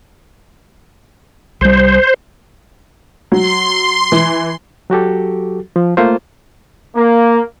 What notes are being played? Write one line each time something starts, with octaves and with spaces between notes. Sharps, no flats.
C2 G3 C5
F#3 C6
E3
F#3 F#4 G4 A4
F3
A3 A#3 F4 C5
A#3